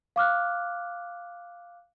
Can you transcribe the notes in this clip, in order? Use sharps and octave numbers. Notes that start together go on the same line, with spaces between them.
F5 D6 F6 F#6